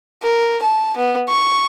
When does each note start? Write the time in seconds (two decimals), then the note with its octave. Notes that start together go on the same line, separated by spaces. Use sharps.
0.23 A#4
0.63 A5
0.97 B3
1.29 C#6